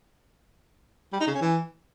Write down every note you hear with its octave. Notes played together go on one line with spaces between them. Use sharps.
G3
D#4
C#3
C#4
E3